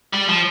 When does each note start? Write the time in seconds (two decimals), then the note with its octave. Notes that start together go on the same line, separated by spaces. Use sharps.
0.13 G3
0.29 F3